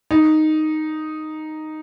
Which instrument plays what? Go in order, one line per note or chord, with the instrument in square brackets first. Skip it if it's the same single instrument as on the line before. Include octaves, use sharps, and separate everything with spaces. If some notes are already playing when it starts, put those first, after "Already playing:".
[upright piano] D#4